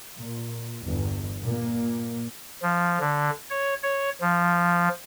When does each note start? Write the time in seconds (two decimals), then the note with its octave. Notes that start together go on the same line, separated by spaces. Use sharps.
0.17 A#2
0.83 G1 E2 G2
1.41 A#2 A#3
2.62 F3
3.00 D3
3.50 C#5
3.83 C#5
4.21 F3